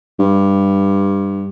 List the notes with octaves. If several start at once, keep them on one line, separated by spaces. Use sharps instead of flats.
G2